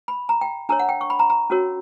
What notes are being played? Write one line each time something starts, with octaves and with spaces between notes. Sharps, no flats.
B5
A#5
G5
D4 A#4 C#5 A#5
F#5
G5
C#6
B5
A#5
A#5
C#4 F#4 A#4 C#5